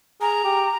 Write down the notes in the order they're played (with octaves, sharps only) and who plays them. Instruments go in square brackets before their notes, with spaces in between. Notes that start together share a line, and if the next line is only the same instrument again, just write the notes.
[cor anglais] G#4 [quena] A#5
[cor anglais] G4